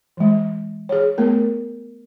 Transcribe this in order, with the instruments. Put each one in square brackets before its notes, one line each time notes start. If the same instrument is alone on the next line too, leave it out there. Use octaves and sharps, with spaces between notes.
[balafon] E3 G#3
G#4 C#5
A3 B3 A#4